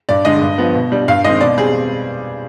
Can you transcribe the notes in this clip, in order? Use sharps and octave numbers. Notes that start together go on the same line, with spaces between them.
G2 D5
D3 G#3 D4 D#5
G2
F3 B3
B2
G3 D4
G2 F5
D#3 G#3 C4 D#5
B2 D5
G3 C4 G#4